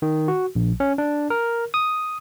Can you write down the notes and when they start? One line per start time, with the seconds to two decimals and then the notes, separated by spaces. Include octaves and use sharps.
0.02 D#3
0.28 F#4
0.55 A#1
0.80 C#4
0.98 D4
1.30 A#4
1.74 D#6